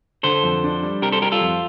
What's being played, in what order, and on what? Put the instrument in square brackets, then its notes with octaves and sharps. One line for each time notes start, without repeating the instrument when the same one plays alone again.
[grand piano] D3 [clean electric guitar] A4 C5
[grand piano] F2
D4
G3
[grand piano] C3 [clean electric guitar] G4 A#4
[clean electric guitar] A4 C5
[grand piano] G3 [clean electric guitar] G4 A#4
[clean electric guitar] F4 A4
[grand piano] F2